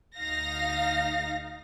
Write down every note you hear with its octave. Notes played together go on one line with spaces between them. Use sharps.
D2 D#4 F5 A#6